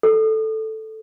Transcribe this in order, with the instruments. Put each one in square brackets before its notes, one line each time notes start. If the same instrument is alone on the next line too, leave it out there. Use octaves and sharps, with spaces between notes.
[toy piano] A4